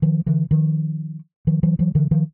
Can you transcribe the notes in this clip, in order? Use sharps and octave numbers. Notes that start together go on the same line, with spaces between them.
D#3 F3
D3 E3
D#3 F3
D#3 F3
E3 F#3
E3 F#3
D3 E3
D#3 F3